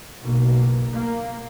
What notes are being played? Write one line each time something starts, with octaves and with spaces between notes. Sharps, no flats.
F#1 B1 B2 A#3
A#3